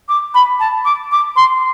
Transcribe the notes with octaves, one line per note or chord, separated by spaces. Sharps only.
D6
B5
A5
D6
D6
C6